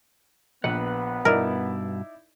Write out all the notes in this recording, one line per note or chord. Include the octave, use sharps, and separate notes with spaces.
A#1 B3 B4 F#5
G2 B2 D#4 E4 A#4 D5